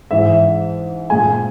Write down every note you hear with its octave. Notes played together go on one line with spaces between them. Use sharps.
G#2 E3 G#3 E5
A#2 G#3 G#5